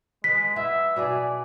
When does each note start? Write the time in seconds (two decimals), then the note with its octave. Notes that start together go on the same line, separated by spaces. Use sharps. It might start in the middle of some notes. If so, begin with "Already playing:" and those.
0.24 G#3 B4 B6
0.56 B3 E4 E5
0.96 B2 E4 G#4 D5